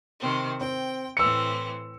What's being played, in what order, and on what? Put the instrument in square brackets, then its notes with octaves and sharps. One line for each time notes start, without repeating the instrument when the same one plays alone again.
[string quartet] C3 D#3 C4
[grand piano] C4 [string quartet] G5
[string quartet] A2 E3 C4 [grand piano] E6 C#7